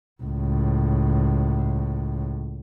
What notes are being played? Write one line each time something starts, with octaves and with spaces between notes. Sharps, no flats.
C#2 A2